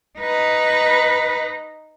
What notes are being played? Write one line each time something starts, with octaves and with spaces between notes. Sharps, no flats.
D#4 B4